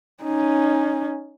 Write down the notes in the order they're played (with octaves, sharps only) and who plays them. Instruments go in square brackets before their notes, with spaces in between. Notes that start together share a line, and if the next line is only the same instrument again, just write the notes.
[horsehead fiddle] C#4 D#4